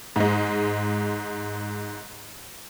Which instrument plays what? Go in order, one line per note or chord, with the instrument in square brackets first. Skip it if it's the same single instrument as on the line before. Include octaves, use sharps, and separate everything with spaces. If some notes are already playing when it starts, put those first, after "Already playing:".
[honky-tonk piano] G#2 G#3